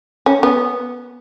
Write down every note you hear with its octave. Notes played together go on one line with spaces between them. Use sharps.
C#4
B3